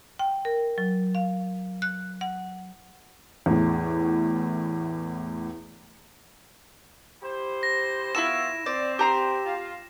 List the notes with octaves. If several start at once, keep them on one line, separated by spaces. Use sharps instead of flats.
G5
A#4
F#3
F5
F#6
F#5
E2 A2
E4 G4 C5
A#6
B3 E4 F4 C#6 E6 E7
C4 D5
G4 A#5 C6
F4